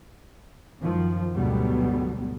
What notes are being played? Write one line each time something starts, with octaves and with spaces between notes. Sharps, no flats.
F#2 D#3 F3
D2 G#2 B2 F#3 G3 B3